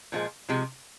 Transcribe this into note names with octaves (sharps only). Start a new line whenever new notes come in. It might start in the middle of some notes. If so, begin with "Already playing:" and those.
A#2 F3 G#3
C3 F3 G#3